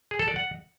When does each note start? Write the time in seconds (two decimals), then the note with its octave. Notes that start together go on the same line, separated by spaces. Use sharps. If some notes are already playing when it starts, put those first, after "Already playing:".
0.11 G#4
0.19 A4
0.28 D5
0.36 F#5